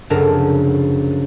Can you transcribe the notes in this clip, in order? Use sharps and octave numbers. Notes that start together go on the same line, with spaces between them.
F1 F#2 C#3 D4 A#4 A5